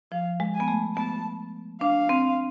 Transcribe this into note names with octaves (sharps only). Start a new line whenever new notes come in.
F3 F5
G#3
G#5
B3
A3
B3 A5
D4 F5
C4